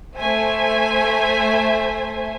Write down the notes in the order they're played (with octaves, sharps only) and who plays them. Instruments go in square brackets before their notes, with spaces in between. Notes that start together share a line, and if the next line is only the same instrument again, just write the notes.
[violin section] A3 C5 E5 G#5